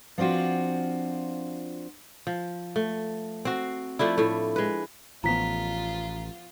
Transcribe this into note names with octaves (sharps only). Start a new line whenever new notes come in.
F3 C4 D4 F4 F#4
F3
A3
C4 F#4
F3 A3 D4 E4
A2 A3
G#3 B4
A1 F3 B3 F4 A#5 B6